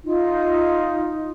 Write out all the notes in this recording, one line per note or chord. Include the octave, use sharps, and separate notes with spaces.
D#4 F4